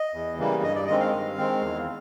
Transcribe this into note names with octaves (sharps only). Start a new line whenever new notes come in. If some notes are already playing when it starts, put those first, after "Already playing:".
Already playing: D#5
E2
C#3 E3 G3 A#3
G2 D#5
D5
D#3 G#3 C4 D#5
F5
G2
D#3 G#3 C4
E2